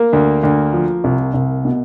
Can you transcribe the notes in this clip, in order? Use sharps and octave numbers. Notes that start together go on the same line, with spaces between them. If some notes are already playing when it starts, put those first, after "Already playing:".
Already playing: A#3
D2
D2
F3
C2
C2
B2